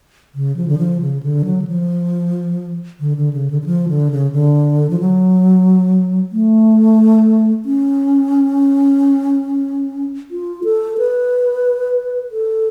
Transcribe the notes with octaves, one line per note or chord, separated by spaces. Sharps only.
C#3
F3
D3
F3
C#3
D3
F#3
D3
F3
D3
D3
C#3
D3
D3
F3
D3
C#3
D3
F3
F#3
A3
C#4
F4
A4
B4
A4